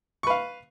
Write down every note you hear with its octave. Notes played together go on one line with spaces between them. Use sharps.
B4 F5 C#6